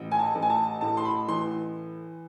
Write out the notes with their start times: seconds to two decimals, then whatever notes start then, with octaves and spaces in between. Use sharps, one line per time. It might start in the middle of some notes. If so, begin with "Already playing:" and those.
Already playing: A1
0.11 G#5
0.19 A5
0.35 A1
0.42 G#5
0.50 A5
0.81 A2 A5
0.97 C6
1.05 B5
1.28 E3 C6